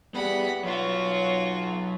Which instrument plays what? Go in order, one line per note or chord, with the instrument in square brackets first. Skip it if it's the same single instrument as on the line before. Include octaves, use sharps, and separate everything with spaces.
[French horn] G3 [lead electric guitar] B3 G#4 [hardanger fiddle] F#5 B5
[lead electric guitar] F#3 B4 [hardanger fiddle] F4 F#4 [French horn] C#5